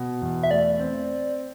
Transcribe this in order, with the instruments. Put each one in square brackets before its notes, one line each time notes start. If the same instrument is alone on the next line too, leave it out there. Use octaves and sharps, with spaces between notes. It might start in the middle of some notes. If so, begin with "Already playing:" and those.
Already playing: [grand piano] B2
E2
[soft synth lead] E5
[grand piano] A3 [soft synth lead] D5
[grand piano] C4